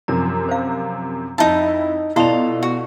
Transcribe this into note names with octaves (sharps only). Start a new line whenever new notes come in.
F#2 C3 F3 A#5
C5 F5
F2 D#4 E4 A5
B2 E4 F4 A4 D5 D#5 F7
F#4